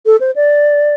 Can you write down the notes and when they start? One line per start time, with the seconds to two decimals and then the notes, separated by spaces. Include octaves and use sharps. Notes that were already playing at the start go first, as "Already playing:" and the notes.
0.06 A4
0.20 C5
0.36 D5